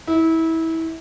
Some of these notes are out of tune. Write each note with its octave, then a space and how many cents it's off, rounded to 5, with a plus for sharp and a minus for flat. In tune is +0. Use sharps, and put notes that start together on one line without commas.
E4 -25